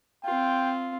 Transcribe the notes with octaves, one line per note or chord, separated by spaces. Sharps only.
C4 F4 G5